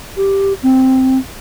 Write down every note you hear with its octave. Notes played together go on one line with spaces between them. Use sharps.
G4
C4